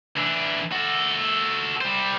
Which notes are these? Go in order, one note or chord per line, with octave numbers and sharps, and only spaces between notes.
E3 D4
F#4 A4
G3 C5